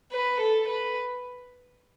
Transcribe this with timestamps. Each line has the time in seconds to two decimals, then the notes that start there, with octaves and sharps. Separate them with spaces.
0.12 B4
0.41 A4
0.68 B4